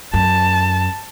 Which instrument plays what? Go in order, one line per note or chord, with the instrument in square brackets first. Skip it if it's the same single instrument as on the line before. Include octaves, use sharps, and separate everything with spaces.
[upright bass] F#2 [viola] A5